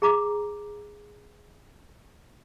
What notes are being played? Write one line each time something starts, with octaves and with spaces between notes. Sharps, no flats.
G#4 A#5 D6